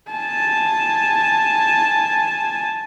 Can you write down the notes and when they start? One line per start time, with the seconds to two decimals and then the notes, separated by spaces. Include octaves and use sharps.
0.10 G#5 A5